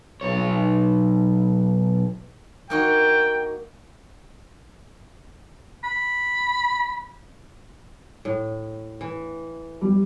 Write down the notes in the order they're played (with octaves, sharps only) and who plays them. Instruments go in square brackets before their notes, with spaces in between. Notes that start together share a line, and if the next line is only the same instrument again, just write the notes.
[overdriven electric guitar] B1 C#5
[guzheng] A#3 D#4 F#4 [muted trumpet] G5
[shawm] B5
[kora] A2
E3
[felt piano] G3